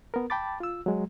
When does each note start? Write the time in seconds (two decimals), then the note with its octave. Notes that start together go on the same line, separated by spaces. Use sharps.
0.14 B3 A#4
0.30 G5 A5 B5 D6 A6
0.60 F4 E6
0.86 F#3 G#3